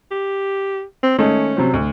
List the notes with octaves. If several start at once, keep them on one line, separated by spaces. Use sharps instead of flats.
G4
C4
D#3 G#3 A3 C#4
C3 F#3 C4
D2